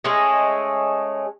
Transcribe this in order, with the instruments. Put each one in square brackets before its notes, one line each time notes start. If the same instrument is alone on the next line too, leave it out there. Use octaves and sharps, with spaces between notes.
[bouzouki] G#3 A3 C#4 G#4